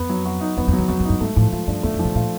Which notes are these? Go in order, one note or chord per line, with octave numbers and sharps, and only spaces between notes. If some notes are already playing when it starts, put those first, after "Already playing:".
Already playing: F2 B3
F#3
F#4
D#4
F2 B3
F2
F#3
E2
F2 F#4
F#2
G2 D#4
G#2 A3
A2 F3
G#2 F4
G2 D4
F2 A3
F2
F3
B2
A#2 F4